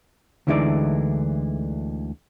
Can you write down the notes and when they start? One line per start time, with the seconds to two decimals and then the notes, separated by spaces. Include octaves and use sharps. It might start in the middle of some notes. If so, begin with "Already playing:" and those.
0.47 D2 D3 E3 G#3 D#4 D5